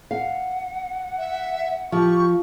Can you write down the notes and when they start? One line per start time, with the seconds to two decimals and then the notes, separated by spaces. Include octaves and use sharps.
0.11 F5 F#5
1.18 E5
1.92 F3 G4 C#6